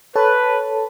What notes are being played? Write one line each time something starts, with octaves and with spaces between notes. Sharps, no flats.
A4 B4 C#5 A5